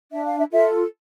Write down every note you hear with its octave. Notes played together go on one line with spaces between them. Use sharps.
D4 E5
F5
E5
F4 A4 E5